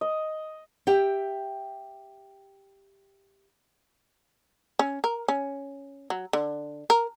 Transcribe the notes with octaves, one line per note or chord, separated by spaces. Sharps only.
D#5
G4 E5 G5
C#4
A#4
C#4
F#3
D3
A#4